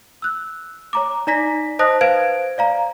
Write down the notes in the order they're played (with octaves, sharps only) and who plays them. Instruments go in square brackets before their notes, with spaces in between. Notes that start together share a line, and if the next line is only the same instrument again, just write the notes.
[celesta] E6 F#6
C#5 A#5 D6
D#4 D5 A#5 A#6 B6
C5 D#5 A5 D#6 F#6 A#6
B4 C5 F5 G#6 D7
D5 F5 A#5